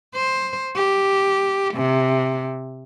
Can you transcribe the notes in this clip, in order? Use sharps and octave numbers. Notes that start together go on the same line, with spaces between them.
C5
G4
C3